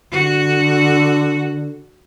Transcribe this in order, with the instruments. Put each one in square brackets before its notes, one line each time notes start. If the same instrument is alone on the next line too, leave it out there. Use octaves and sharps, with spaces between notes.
[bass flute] D3 [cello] F#4